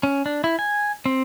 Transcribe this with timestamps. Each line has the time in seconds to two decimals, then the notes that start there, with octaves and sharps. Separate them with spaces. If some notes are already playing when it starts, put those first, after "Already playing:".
0.03 C#4
0.26 D4
0.44 E4
0.59 G#5
1.06 C4